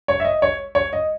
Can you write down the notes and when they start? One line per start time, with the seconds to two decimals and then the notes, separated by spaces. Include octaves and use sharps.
0.08 C#5
0.20 E5
0.25 D#5
0.42 C#5
0.75 C#5
0.93 D#5